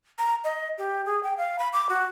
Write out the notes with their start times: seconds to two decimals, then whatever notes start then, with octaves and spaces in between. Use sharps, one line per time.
0.19 A#5
0.44 D#5
0.78 G4
1.06 G#4
1.23 G5
1.38 F5
1.59 B5
1.73 D6
1.89 F#4